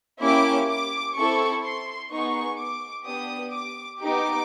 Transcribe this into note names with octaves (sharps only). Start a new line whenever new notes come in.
A#3 C#4 E4 G4 D6
D6
C4 E4 A4 C#6
C6
B3 D#4 G#4 C#6
D6
B3 D4 G4 D#6
D6
B3 D#4 G4 D6